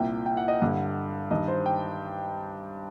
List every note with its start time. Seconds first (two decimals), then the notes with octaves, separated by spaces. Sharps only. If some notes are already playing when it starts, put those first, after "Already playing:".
Already playing: C2 A#2 G5
0.26 G5
0.37 F#5
0.48 D#5
0.60 G2 D3 F#5
1.31 G2 D#3 D#5
1.48 C5
1.66 G5